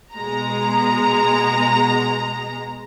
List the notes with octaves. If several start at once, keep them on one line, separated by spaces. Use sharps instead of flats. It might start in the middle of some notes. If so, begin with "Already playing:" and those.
B2 G#3 A#5